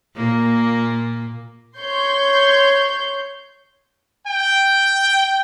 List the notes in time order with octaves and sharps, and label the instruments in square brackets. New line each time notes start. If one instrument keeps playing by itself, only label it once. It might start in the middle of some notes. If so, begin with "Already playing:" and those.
[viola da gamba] A#2 A#3
[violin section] C#5 C6 G6
[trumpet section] G5